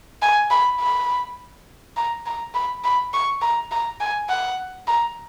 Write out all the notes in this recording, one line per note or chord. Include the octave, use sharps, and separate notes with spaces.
G#5
B5
B5
A#5
A#5
B5
B5
C#6
A#5
A#5
G#5
F#5
A#5